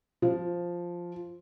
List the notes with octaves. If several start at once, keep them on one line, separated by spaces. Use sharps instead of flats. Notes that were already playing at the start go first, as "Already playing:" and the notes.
F3